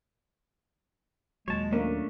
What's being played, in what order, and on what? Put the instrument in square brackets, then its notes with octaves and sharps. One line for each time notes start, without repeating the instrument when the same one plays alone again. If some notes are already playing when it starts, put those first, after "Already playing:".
[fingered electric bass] D#2 A#2 F#3 [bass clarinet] G#3 [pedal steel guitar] C#5 A5
[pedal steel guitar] A3 C#4 D4 [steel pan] A#3